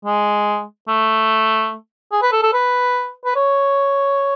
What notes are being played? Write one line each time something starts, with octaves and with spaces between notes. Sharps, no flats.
G#3
A3
G#4
B4
A4
A4
B4
B4
C#5